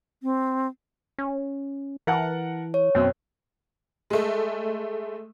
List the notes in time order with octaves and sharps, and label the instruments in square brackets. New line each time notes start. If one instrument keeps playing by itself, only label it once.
[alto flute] C4
[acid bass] C#4
[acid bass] E3 [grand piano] A#4 F#5 A5
[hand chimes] C#5
[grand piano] F#2 B2 [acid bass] C4
[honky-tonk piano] G#3 A3